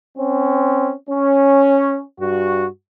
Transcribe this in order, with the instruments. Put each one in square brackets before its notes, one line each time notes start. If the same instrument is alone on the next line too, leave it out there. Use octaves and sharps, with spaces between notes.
[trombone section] C4 C#4
C#4
G2 F#4